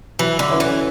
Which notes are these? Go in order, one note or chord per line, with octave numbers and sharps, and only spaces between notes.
E3 F#3
D3
C#4 E4 B4
E3